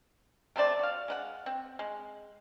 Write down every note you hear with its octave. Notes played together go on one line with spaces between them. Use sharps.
C3 A3 C5 D5
F#4 F5
G#3 B4 F#5
C4
G#3